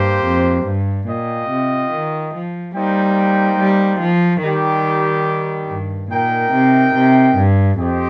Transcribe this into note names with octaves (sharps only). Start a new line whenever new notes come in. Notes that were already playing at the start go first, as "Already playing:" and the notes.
Already playing: G2 A#3 G4 C5
F2
G2
A#2 F4 D#5 G5
C3
D#3
F3
G3 A#3 D#4 C5 G5
G3
F3
D#3 G3 D#4 G4
G2
A#2 D#4 A#4 G5
C3
C3
G2
F2 C4 G4 C5 D#5 G5